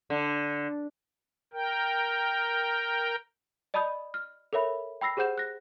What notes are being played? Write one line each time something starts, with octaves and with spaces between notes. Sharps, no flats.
D3
A#4 G5
D5 D#5 A5 B5 D#6 G6
F6
A4 A#4 C#5 E5 B5
G5 B5 E6 A#6 C7
G4 G#4 C5 F#5 G6 E7
F#6 A#6